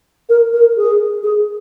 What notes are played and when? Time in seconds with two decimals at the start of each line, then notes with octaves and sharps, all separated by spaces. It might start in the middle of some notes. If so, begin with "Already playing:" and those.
0.29 A#4
0.53 A#4
0.77 G#4
1.23 G#4